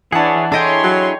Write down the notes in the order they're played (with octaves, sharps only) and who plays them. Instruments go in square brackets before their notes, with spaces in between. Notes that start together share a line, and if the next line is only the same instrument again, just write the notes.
[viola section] E3 D4 [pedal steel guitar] G#4 C#5 [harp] F#5 A5
[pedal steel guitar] D4 E4 G#4 [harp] A4 D#5 G5 [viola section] C#5 C6
[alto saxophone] F#3